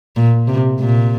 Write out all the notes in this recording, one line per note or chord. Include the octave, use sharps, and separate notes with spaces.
A#2
C3
A#2